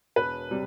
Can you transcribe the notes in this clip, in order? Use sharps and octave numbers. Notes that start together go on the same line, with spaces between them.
E1 B4
C3 G3